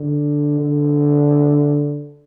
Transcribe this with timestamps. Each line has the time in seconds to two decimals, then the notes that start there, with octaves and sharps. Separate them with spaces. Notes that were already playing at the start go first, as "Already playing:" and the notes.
Already playing: D3
0.60 D3